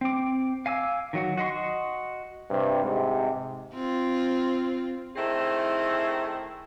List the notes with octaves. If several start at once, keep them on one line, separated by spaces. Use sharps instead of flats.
C4 D6
F5 G#5 D6 E6
D#3 F#3 F#4
F#4 D#5 C6 C#6
G2 C3
G#2 C3
C4 F4
D#3 A3 C4 E4 G#4